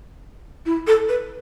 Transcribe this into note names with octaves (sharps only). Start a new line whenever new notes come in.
E4
A4
B4